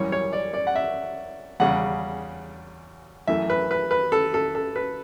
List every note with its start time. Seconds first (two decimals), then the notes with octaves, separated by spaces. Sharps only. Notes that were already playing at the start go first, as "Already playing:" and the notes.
Already playing: F#2 E3 G3 C#5
0.12 C#5
0.33 D5
0.54 D5
0.67 F#5
0.76 E5
1.60 E2 C#3 G3 F#5
3.27 F#2 E3 A3 E5
3.50 B4
3.71 B4
3.91 B4
4.12 A4
4.34 A4
4.55 A4
4.76 B4